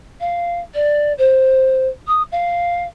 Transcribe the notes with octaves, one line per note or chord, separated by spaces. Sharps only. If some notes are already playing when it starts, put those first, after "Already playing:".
F5
D5
C5
D#6
F5